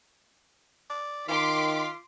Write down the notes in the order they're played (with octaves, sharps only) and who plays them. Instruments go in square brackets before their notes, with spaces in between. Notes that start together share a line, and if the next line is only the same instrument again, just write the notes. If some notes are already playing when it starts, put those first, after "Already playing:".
[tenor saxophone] D5
[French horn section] D#3 [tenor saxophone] F4 [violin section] C6 D6 B6